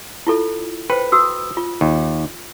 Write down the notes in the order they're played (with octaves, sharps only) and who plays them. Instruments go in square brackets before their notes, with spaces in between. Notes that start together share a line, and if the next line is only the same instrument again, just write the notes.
[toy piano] E4 F4 A4
[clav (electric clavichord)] B4 [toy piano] C5 G5
[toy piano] F#4 D#6 E6
F4
[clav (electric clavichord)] D#2